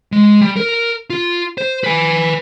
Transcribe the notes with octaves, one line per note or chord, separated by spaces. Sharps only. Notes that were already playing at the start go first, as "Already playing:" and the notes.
G#3
G3
A#4
F4
C5
B4 G#5